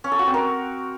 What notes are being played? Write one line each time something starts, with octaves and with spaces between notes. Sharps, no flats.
C#4
A4
F#4
C4
A#4